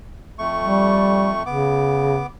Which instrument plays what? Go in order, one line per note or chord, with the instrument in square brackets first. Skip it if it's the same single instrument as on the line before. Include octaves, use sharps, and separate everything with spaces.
[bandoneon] F2 A3 C#6
[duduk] G3
[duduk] C#3 [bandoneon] B3 D6